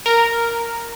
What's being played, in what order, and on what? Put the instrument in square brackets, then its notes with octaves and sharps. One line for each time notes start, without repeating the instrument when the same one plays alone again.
[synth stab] A#4